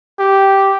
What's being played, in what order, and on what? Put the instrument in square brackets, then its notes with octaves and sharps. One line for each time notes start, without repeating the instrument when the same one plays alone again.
[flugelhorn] G4